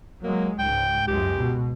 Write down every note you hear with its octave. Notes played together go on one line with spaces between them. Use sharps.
F#3 G#3 A#3
C#2 G#2 G5
C#2 F#2 G#3 G4
B2